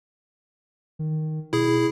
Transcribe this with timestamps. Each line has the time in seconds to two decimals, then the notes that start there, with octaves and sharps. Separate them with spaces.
0.99 D#3
1.53 B2 E4 G#4